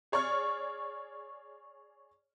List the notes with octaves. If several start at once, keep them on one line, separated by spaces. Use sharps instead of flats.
G#4 C#5 D5 C#6 F6